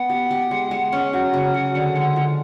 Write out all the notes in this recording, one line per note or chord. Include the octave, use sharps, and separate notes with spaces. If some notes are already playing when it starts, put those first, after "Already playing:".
Already playing: B3 F#5
G4
G4
G#3
G#3
C#4
F#3 F#5
C#3
F#3
D3
G#3
F3